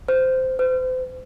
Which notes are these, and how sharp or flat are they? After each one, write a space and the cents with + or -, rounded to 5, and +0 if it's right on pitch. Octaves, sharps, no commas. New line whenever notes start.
C5 -10
C5 -35